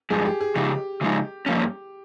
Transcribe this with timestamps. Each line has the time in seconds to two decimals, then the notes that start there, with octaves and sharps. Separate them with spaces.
0.10 G2 F3 G#3 G#4
0.25 G4
0.41 G#4
0.56 C#3 F3 G#3 D#4 G4
1.01 C#3 F3 G#3 D#4
1.46 G2 F3 A#3 C#4